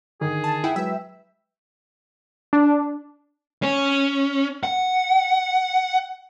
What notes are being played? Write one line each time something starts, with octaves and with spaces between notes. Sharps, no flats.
D3 D#3 G#4
A5
E4 F#5 G5
F#3 G#3 B4 E5
D4
C#4
F#5